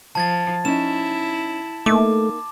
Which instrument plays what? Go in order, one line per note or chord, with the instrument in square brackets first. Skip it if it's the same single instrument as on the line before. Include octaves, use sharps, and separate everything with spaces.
[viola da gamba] F3 [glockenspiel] A5 G#6 A6
[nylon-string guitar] C#4 D#4 [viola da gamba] E4 [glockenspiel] E7
[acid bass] A3 [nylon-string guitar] A#3 D#4 [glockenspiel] D6